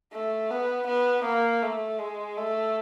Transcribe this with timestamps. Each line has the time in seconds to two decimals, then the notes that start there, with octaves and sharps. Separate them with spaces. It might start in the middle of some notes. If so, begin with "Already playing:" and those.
0.13 A3
0.51 B3
0.87 B3
1.25 A#3
1.63 A3
1.99 G#3
2.37 A3